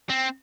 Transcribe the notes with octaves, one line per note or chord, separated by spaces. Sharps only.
C4